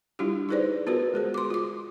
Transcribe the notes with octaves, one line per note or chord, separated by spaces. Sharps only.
G3 D4 E4 F4 G4
D#4 G4 G#4 B4 C5 D5
B3 F4 F#4 A#4 B4
G#3 G#4 C5
C6 D6
F4 D6